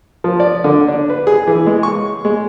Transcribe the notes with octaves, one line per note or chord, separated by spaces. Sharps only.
F3
D5
D3
D4
B4
G#4
E3
G#3
C#6
G#3